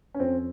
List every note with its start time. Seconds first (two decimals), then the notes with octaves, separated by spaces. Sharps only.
0.14 C#4
0.20 F2 C4